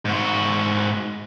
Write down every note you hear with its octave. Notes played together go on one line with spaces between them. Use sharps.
G#2 F#4